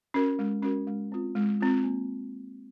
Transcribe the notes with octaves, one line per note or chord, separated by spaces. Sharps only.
C#4 F#4 A#4
G#3
C#4 F#4 A#4
G#3
C4 F4
G#3
C4 F4
A#3